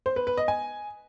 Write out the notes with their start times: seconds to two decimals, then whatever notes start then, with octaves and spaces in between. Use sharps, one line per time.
0.06 C5
0.16 B4
0.27 B4
0.37 D#5
0.48 G#5